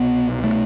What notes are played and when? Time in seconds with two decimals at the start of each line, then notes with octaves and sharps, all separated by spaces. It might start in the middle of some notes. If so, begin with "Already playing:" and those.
Already playing: C2 B2 B3
0.44 A3